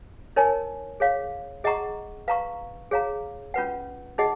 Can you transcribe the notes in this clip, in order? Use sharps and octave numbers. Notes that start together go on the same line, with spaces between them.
D#4 A#4 C#5 G#5
G#4 C#5 F5
G#4 D#5 F#5 A#5 C#6
B4 F5 A#5 C#6
G#4 C#5 F5 A#5
C#4 F4 B4 F#5
D#4 G#4 D#5 F#5